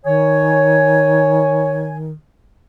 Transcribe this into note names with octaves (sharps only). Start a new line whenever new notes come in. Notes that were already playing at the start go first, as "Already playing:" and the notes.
D#3 C#5 G#5